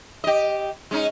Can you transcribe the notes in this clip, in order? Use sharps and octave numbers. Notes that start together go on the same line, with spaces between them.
G4 D#5
G#3 C#4 D#4